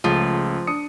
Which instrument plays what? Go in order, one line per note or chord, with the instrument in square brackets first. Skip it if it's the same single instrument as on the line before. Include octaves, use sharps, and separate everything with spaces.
[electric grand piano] C#2 C#3 A3 [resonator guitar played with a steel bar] F3
[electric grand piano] D4 D#6 C#7